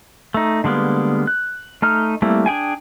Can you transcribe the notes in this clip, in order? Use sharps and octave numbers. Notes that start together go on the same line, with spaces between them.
A3 D#4
D3 G3 G#3 A#3 B3
F#6
A3 D#4 F6
G3 A3 A#3 C4 E4
D4 G#4 G5 G#5